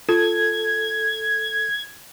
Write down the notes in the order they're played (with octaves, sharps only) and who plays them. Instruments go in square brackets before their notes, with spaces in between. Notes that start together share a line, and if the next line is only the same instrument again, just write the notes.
[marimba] F4 [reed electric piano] A4 [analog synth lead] G#6